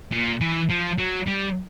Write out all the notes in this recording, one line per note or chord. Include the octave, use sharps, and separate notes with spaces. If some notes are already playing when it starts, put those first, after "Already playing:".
A#2
E3
F3
F#3
G3